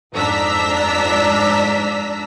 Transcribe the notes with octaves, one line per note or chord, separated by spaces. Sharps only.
F2 G#2 D4 A#5 E6 B6